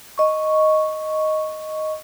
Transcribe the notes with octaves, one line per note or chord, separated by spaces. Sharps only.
D#5 C#6